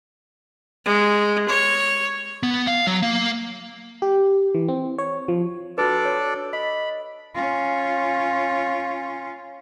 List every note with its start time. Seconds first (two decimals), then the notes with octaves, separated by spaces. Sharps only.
0.85 G#3
1.48 C#5
2.43 B3
2.67 F5
2.87 F#3
3.02 A#3
4.02 G4
4.54 E3
4.68 C4
4.99 C#5
5.28 F3
5.78 D4 F#4 A4 B4 D5
6.05 C#5
6.53 D#5 B5 B6
7.35 C#4 F4